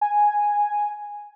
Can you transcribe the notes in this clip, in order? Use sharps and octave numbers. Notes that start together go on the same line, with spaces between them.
G#5